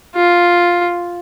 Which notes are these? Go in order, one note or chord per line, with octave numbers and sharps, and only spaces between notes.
F4